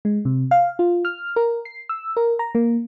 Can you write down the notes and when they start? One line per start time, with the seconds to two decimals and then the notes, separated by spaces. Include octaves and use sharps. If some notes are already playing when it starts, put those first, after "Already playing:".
0.05 G#3
0.25 C3
0.51 F5
0.79 F4
1.05 F6
1.36 A#4
1.65 C7
1.89 E6
2.17 A#4
2.39 A#5
2.55 A#3